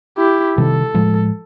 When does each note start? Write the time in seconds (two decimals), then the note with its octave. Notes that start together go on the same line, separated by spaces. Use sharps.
0.18 E4 G4
0.58 C3 D#3 G3 A4
0.94 A2 F3 G#3